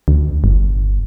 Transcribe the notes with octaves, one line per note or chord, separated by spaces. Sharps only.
D2
G1